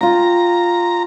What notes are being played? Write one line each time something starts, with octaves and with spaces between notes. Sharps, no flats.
F4 G5 A#5